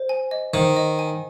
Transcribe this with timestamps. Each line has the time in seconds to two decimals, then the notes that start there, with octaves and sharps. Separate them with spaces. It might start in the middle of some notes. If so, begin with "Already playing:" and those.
Already playing: C5
0.09 G#5
0.31 D#5
0.54 D#3 C5
0.77 D#5
0.99 G#5